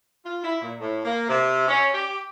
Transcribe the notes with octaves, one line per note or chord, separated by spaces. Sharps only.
F4
E4
A#2
A2
A#3
C3
C#4
G4